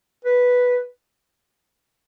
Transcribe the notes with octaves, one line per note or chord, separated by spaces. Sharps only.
B4